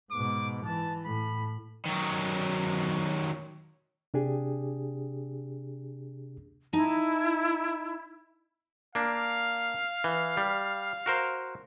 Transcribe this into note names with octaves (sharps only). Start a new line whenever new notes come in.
G#2 B2 D6
E3 A5
A2 B5
D#3 F#3
C3 D4 G4 G#4
D#4 E4 A5
A#3 D4 F5
E3
G3
F#4 A#4 C5